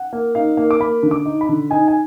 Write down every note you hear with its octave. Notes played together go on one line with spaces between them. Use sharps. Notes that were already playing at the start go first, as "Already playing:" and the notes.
Already playing: F#5
A#3
D#4 F5
A#3
D6
A#3 B5
D3
D6
D#4
B5
D3
D#4 G#5
G#5